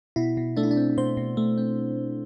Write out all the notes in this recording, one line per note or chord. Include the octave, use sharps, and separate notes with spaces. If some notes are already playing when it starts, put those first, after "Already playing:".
B2 E4
B2
A3 D4
E4
D4
C4
B2 C5
B2
A3
C4